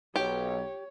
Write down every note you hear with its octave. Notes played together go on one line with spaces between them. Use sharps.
B1 G4 C#5